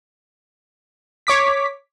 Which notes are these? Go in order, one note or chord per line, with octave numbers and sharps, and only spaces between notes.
C#5 D6 B6